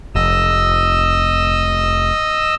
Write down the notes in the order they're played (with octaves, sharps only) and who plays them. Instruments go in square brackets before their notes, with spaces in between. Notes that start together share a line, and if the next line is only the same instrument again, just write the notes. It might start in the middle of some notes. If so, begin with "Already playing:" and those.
[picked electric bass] F1 [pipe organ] D#5 E6